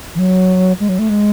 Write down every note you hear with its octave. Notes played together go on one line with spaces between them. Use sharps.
E3
F#3
G#3
F#3
A3
G#3